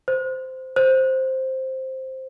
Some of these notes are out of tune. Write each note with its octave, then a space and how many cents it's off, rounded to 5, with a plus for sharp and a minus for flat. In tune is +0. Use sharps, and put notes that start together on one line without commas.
C5 -10
C5 +5